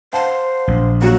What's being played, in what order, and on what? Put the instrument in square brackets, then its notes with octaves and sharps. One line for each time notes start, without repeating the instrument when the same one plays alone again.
[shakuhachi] C5 [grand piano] F5 F#5 A5
[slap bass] A#1
[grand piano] F#3 G3 A#3 [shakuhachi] F#4